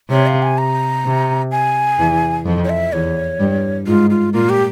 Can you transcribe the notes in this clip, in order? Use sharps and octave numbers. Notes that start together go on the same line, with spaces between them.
C3 C#5
F5
G#5
A#5
C3
G#5
E2 E3
F2 F3
C#5
E5
E2 E3 C#5
G2 G3
G#2 G#3 F4
F4
A#2 A#3 F4
G4